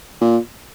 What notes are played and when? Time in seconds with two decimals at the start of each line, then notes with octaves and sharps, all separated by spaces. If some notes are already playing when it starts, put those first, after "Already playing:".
0.21 A#2